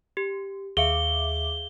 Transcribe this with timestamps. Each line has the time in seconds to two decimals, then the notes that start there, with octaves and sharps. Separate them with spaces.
0.17 G4
0.77 D#2 G#4 E5 F5 D6 C#7 G7